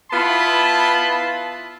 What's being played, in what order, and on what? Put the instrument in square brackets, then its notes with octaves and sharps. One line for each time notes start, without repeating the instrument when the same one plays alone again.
[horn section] B3 E4 F4 A5 B5